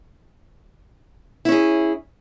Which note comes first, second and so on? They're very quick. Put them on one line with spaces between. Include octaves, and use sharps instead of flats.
E4 C#4 G#4